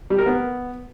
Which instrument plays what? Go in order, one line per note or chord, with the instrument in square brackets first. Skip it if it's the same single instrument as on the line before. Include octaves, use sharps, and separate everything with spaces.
[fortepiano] G3
A#4
B3